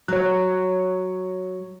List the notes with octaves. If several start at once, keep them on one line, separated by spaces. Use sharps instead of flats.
F#3 C#5 F#6